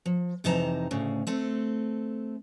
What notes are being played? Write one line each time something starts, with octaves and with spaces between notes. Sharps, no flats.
F3
F2 C3 E3 D#4 A5 A#5
D2 A2 C#3
A3 C4 A4